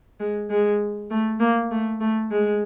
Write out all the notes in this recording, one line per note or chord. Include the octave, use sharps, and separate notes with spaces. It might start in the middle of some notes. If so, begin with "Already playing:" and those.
G#3
G#3
A3
A#3
A3
A3
G#3